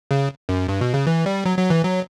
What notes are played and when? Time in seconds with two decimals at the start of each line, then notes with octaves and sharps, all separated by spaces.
0.11 C#3
0.49 F#2
0.68 G2
0.81 B2
0.94 C#3
1.07 E3
1.26 G3
1.45 F#3
1.58 F#3
1.70 E3
1.83 F#3